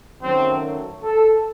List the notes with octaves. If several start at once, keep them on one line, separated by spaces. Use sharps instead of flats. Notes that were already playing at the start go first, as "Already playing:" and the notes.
F#2 D#3 F#3 A3 C4
A4